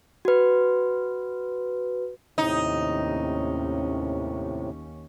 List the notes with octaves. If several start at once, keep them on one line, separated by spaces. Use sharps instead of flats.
F#4 B4
D#2 A2 C3 C#4 D#4